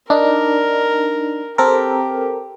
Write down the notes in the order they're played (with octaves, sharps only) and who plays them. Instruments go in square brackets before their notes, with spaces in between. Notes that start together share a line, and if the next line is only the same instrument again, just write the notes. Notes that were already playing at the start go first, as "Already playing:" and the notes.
[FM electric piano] D4 D#4 [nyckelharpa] A#4
[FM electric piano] C4 A4 A#4 [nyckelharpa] G4